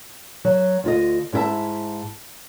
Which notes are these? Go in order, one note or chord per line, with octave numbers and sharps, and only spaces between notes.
F#3
D2 F4 D#5
G#2 E4 G4 E5 A5